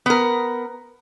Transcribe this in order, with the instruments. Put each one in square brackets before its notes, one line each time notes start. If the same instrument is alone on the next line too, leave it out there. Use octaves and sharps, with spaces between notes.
[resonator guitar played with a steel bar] B3 A#4